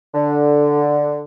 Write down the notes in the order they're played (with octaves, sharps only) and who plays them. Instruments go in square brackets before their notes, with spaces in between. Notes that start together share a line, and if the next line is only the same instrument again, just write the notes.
[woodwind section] D3